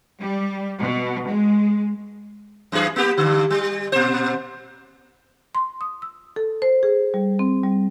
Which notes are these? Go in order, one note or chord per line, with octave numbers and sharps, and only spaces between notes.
G3
B2
G#3
F#2 E3 G#4
A#3 B3 G4
G2 D3
G3
A#2 C5
C6
D#6
E6
A4
C5
G#4
G3
C4
G3